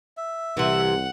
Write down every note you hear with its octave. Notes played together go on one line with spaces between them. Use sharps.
E5
C2 C3 E3 F#5